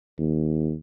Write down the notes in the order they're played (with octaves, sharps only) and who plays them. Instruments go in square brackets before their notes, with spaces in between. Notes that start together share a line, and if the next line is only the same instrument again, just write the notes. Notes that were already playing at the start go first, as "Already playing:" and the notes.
[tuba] D#2